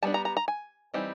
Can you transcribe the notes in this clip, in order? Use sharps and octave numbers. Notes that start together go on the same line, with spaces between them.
G3 B3 D4 A5
A#5
A#5
A#5
G#5
E3 G3 C4 D#4